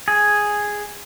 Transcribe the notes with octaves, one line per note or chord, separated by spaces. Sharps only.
G#4